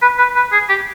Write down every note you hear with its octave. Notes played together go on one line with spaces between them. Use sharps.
B4
B4
B4
G#4
G4